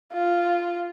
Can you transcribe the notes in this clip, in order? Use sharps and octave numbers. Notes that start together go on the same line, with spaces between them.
F4